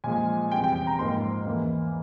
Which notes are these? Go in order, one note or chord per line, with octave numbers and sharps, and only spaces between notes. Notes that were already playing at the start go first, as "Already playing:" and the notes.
A#2 F3 G#3 G#5
E2 C3 G3 G5
G5
G5
A#5
G#2 F3 A#3 C6
E2 E3 A#3